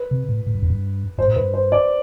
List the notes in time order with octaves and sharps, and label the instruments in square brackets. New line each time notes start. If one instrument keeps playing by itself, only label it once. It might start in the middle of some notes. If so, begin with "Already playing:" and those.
Already playing: [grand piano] B4
[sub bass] C3
A2
A2
G2
F2
G2
[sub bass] G2 [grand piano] C5
[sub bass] A2
[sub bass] G2 [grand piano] B4
[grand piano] C5
D5